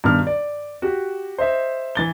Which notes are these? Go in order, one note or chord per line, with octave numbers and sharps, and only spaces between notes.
G2 B2 D#3 F6
D5
F#4 G4
C5 D#5 E5
E3 A6 G7